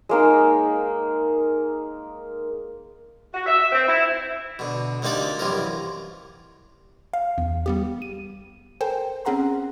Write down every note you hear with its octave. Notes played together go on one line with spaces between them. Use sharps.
G#3 A#3 D#4
F#4
E5
C4
E4
B2 D3
D2 C3 A#3 D#4 G4 D5
C2 F#2 C3 E3 F3 A#4
F5
E2
G3 B3 G4
D#7
A4 A#4 C5 G5 G#5
C4 C#4 G#4 F#5 A#5 C6